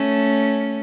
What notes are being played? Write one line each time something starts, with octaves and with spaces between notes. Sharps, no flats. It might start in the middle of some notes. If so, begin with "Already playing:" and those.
Already playing: A3 C#4